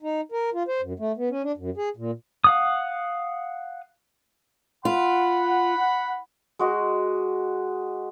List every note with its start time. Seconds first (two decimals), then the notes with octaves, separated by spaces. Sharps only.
0.02 D#4
0.32 A#4
0.54 F4
0.68 C5
0.81 F#2
0.99 A3
1.17 B3
1.30 C#4
1.43 D4
1.57 F#2
1.77 G#4
1.97 A#2
2.44 F5 F#5 D#6
4.85 F4 F#5 B5
6.59 G#3 F#4 D#5